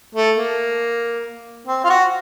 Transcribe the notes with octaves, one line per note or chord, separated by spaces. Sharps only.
A3
A#3
C4
F4
F#4